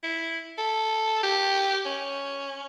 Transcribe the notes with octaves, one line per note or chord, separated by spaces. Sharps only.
E4
A4
G4
C#4